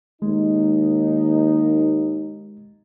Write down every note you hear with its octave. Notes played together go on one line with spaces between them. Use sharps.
D#2 G#3 D#4